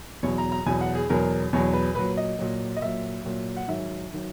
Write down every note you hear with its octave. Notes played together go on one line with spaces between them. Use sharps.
E2 B2 F#3 C#5
A#5
A#5
E2 B2 F#3 G#5
F#5
G#4
E2 B2 F#3 A#4
E2 B2 F#3 C#5
B4
A#2 F#3 B4
D#5
A#2 F#3
D#5
A#2 F#3 E5
A#2 F#3
F#5
G#2 D#3 F#3 E5
D#3 F#3